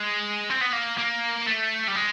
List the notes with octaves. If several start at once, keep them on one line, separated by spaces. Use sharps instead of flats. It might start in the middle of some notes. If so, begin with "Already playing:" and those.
Already playing: G#3
C4
B3
A#3
A#3
A3
G3
G#3